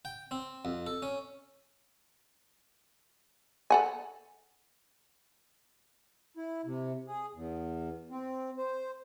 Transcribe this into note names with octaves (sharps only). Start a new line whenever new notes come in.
G5
C4
F2
A4
C#4
A4 F#5 G#5
E4
C3
G#4
E2
C4
C5